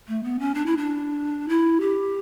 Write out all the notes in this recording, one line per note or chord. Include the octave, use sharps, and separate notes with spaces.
A3
B3
C#4
D4
E4
D4
E4
G4